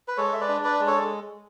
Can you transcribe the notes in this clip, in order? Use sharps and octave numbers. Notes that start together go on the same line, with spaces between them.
B4
G#3 A4 C#5
E5
B4 D5
D4
B4 D5
G#3
A4 C#5